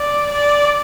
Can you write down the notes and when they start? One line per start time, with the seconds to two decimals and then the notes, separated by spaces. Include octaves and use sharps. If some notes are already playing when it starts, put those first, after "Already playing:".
Already playing: D5
0.31 D5